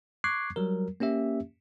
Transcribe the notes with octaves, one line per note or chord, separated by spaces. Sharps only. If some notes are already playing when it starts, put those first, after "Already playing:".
C#6 D6 F#6 G#6 C7
F#3 G3 A#4
A#3 C#4 G4 E5